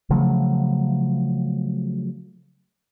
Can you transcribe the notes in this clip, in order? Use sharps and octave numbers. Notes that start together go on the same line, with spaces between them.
C#3 F3 F#3 A3